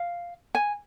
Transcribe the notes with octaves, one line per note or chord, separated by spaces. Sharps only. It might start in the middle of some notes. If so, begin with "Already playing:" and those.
Already playing: F5
G#5